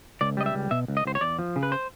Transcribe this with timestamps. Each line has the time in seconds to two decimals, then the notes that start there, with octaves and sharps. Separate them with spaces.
0.21 C#2 D5
0.37 G3 D#5
0.46 E5
0.55 C#2
0.71 B2 E5
0.88 C#2
0.97 D#5
1.05 C#2 C5
1.15 C#5
1.21 E2 D5
1.39 F3
1.56 C#3
1.63 B4
1.72 C5